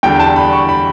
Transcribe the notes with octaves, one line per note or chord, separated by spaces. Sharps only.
E2 D3 G3 D4 G5
A5
B5
C#6
B5